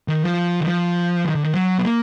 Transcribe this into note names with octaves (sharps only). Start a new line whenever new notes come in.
D#3
F3
D#3
F3
D#3
D3
D#3
F#3
B3
A#3